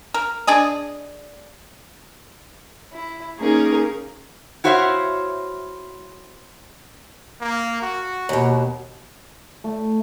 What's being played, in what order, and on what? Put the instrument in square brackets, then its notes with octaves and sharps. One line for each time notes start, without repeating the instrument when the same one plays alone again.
[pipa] A#4
D4 G#4 D#5
[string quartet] E4
A#3 C#4 D#4 G#4 A#4
[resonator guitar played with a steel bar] E4 F#4 C5 C#5 E5 F5
[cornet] A#3
F#4
[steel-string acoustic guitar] D#2 B2
[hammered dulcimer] A3